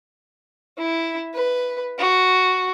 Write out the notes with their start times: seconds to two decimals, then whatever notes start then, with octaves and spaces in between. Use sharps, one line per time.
0.78 E4
1.34 B4
1.99 F#4